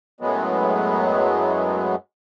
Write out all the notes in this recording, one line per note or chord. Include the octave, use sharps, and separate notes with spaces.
F#2 A2 F#3 G#3 B3